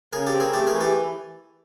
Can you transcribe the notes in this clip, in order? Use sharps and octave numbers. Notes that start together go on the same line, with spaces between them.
C#3 G#4 A#4
G4 A4
C4
G#4 A#4
A3 G4 A4
G#4 A#4
E3
G4 A4